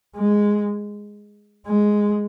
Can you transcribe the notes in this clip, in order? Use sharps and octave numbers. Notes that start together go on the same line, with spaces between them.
G#3
G#3